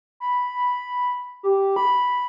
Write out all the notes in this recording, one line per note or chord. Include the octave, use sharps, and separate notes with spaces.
B5
G4
B5